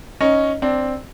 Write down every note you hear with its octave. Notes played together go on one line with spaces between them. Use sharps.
C#4 D#4
C4 D4